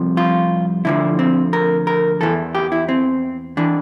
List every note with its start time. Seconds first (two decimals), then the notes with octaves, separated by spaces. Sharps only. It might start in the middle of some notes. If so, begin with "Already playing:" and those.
Already playing: C2 C3 F3
0.17 F4
0.85 D2 D3 F3 E4
1.19 C4
1.53 A#4
1.87 A#4
2.21 E2 E3 A4
2.55 G4
2.72 E4
2.89 C4
3.57 E3 D4